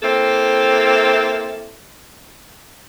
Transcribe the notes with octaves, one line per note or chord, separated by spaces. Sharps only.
A#3 C4 E4 A4